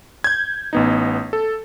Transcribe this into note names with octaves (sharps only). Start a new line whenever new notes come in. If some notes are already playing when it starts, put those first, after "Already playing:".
G6 G#6
A1 B3 D#4
A4